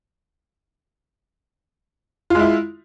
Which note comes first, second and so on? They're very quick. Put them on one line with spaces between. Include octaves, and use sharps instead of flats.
F4 G#3 E4